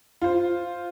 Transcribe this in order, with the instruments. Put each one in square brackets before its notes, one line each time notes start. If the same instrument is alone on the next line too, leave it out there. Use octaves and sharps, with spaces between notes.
[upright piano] F4 C5